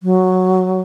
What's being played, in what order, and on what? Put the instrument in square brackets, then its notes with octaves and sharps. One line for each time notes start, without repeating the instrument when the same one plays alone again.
[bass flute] F#3